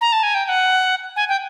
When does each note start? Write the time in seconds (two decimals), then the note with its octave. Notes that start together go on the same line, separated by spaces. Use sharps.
0.01 A#5
0.13 A5
0.23 G#5
0.35 G5
0.45 G5
0.49 F#5
1.16 G#5
1.29 G5